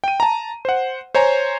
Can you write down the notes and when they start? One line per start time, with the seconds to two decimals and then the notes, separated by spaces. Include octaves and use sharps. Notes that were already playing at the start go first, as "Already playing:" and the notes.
0.04 G5 D#7
0.20 A5 A#5
0.65 C5 F#5
1.15 C5 C#5 G#5 A#5